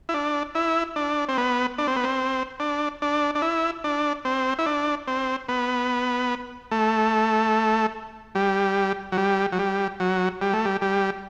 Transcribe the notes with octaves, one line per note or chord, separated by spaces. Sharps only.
E4
D4
E4
D4
C4
B3
D4
C4
B3
C4
D4
D4
D4
E4
D4
C4
E4
D4
C4
B3
A3
G3
F#3
G3
F#3
G3
F#3
G3
A3
G3
G3